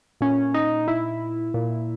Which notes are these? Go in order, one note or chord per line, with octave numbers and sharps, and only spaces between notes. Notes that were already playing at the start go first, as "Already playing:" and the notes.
A#2 C#4
D#4
E4
A#2